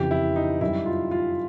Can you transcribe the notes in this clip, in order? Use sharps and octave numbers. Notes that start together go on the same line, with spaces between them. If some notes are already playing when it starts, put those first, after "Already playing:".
Already playing: F2 C#3 E3 G4
E4
D#4
F#2 D#3 G3 E4
F4
F4